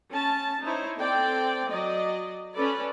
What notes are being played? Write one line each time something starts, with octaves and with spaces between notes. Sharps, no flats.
C#4 A5
D#4 E4 C5 C#5
C4 A4 D5 G5
F#3 D5 D#5
C#4 A4 B4 D5